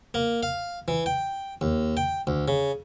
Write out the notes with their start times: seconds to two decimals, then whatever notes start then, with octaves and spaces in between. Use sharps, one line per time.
0.14 A#3
0.43 F5
0.88 E3
1.06 G5
1.61 D#2
1.97 G5
2.27 D2
2.48 C#3